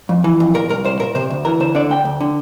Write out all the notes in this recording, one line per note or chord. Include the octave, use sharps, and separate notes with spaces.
F2
E3
F2
A#2 A#4
C2 A#4
C2 C5
A#2 A#4
C3 C5
D2
E3 A#4
D2 C5
D3 D5
D2 G5
D2
D3